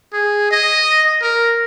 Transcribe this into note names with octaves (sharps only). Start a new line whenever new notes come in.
G#4
D#5
A#4